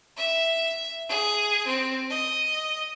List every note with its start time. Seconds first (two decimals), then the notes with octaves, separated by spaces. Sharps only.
0.17 E5
1.09 G#4
1.67 C4
2.10 D#5